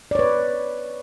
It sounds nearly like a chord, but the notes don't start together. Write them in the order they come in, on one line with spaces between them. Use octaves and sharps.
D5 C#5 B4